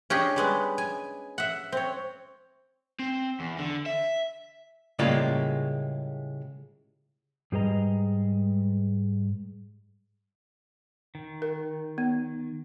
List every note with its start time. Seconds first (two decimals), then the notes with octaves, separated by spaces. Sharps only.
0.10 C#4 D4 G4 G#4 D#5
0.36 G3 G#3 B3
0.78 G#5
1.38 E5 F#5
1.72 C4 C#5
2.99 C4
3.40 E2
3.58 D3
3.86 E5
4.99 A2 C#3 G3 G#3 A#3 F4
7.52 G#2 G3 G#4 B4 D#5 A#5
11.15 D#3
11.42 A#4
11.98 B3